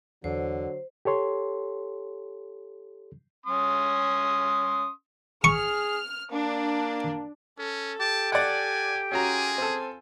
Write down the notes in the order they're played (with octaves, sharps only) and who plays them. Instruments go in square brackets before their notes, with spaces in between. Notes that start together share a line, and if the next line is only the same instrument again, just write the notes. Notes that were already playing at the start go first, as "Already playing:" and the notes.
[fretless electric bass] E2 [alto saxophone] D3 [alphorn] F#3 [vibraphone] C5
[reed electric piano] G4 A4 C#5 C6
[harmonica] C#4 C6 D#6
[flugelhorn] G#4 [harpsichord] C#6 [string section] F6
[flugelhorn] A#3 [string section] D4
[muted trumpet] C#4 [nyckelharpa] A4
[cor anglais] G4 [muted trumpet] A5
[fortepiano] D5 F#5 [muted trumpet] G#5
[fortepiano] C#4 F#4 A#5 [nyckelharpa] F4 G#5 [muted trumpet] G#4
[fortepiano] C4 A4